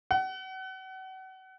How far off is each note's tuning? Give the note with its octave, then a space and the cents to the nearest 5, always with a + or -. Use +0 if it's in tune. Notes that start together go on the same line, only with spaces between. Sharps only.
F#5 +35